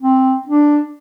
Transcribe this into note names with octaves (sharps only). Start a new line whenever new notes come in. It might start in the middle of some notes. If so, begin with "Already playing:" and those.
C4
D4